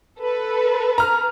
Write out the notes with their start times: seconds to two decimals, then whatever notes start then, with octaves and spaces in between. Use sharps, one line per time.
0.20 A4 B4
0.98 A#5 F6